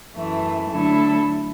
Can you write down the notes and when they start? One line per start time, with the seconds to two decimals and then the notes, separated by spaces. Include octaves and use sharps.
0.17 F#2 E3 A3
0.71 D3 F#3 A3 E4 A4